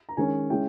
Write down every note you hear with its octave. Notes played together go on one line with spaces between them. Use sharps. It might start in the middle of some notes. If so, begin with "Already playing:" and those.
A#5
D#3 G#3 C#4 G#5
G#3 C#4 E4 G5